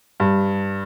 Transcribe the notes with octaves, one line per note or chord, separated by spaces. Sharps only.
G2